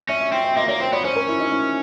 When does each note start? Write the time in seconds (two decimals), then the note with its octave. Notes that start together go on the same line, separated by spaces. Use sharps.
0.09 C#4 E5
0.21 E5
0.32 C4
0.44 E5
0.56 A#3 D#5
0.69 A#3 C#5
0.80 C4 C5
0.93 B3 C#5
1.05 C#4 C5
1.16 A#4
1.28 E4
1.40 D#4
1.52 E4